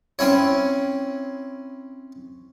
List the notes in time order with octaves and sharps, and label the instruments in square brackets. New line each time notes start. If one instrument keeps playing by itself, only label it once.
[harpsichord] C4 C#4 E4 C#5